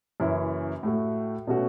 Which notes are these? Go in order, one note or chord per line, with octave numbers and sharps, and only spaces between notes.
F#1 F#2 E3 C#4 E4
A2 A3 F#4
B2 A3 C#4 F#4